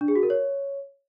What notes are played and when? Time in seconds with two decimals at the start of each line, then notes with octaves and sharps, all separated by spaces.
0.01 D4
0.08 G#4
0.15 F#4
0.23 A#4
0.30 C#5